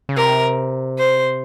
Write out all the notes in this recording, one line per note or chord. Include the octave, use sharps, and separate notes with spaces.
C#3
C3 A#4
C5